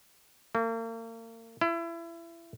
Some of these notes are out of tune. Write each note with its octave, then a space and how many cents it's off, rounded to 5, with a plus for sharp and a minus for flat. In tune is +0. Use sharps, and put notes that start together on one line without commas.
A#3 -40
E4 +30